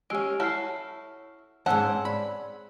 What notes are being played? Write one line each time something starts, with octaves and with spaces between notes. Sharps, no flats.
G#3 C#4 G4 E6 D7
E4 F#4 A4 C#5 F6 C7
D#2 G#2 C4 C#4 F#5 A5 E6 F#6
D5 B5